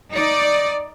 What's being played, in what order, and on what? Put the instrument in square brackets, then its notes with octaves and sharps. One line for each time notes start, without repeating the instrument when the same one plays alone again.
[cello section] D#4 D5